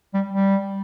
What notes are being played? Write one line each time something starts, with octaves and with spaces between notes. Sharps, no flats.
G3
G3